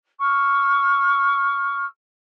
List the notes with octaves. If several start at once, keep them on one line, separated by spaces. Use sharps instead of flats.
C#6 E6 F6